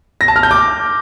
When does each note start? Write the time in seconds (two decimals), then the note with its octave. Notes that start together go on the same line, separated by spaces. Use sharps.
0.21 A#6
0.28 A5
0.36 F6
0.43 G6
0.51 D6